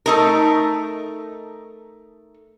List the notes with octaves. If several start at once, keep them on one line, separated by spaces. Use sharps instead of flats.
A3 D#4 A#4